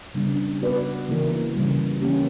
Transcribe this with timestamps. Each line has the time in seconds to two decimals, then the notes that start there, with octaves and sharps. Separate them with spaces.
0.14 C#3 G3 B3 D4
0.61 B3 F#4 B4 D5
1.08 C#3 E3 A#3 E4 A#4
1.55 C#3 E3 G3
2.02 E3 A#3 C#4 G4